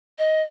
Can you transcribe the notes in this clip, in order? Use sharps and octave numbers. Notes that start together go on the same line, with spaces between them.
D#5